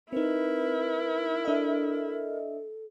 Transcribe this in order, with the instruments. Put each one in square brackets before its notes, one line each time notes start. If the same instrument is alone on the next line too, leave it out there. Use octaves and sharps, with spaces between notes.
[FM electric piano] C4 D#4 [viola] E4 [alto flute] A#4 [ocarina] B4
[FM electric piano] D4 D#5 E5 [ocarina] A4